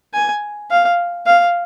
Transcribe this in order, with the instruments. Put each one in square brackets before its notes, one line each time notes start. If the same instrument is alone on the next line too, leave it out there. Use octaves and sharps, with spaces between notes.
[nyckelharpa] G#5
F5
F5